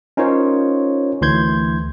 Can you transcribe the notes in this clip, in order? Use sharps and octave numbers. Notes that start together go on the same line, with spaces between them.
C#4 D#4 F4 A#4 C5 C#5
D2 E3 C6 G6 G#6